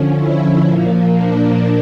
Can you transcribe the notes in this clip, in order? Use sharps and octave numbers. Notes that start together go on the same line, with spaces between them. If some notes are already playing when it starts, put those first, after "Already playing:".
Already playing: D3 F3 C#4
E4
A#2 F3 A#3
D4